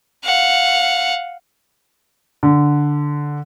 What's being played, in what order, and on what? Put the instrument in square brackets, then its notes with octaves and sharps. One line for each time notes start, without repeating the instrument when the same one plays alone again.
[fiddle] F5 F#5
[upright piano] D3